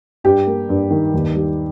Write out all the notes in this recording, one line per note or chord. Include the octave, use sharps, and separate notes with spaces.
G2 G4
A#3
G2
D#3
D#2
G3